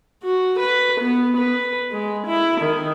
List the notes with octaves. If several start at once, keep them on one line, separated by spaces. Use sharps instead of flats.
F#4
B4
B3
B4
G#3
E4
D#3